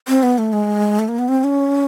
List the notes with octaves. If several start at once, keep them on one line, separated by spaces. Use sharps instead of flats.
C4
B3
A3
G#3
A3
A#3
B3
C4
C#4